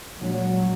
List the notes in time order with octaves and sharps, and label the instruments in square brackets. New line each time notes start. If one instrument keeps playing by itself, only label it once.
[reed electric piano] A#2 G#3 D4 [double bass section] F#3